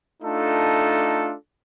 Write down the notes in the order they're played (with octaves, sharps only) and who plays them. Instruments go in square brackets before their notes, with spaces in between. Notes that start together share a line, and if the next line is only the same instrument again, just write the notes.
[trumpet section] A3 D4 D#4 F4 A4